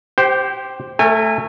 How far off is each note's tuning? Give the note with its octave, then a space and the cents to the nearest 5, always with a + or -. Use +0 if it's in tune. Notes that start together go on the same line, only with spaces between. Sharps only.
G4 +0 C5 +5 G5 -35
A3 +0 A#4 -40 G#5 -25